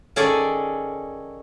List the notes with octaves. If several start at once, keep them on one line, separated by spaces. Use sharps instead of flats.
D#3 C#4 G#4 A4 D5